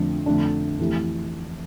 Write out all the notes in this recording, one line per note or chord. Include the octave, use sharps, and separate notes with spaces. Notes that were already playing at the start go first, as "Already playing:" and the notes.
Already playing: F2 D3 F3 A3 D4
F2 D3 A3 D4
F2 E3 A3 E4 G4